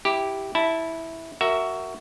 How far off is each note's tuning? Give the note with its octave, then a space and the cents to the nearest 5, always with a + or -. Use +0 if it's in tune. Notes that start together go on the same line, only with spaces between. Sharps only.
E4 -10 G4 +0
E4 -10 A5 +0
F#4 +15 A#4 -15 E5 +0